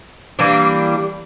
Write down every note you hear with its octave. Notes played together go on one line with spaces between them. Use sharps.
E3 G3 A#3 D4